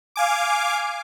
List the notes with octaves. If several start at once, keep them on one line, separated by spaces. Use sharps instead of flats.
F5 G#5 D6